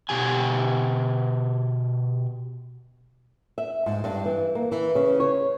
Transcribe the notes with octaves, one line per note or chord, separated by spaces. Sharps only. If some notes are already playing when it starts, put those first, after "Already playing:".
B2 G4 G#5
E5
G#2
G2
E3
A#3
E3
C#3
C#5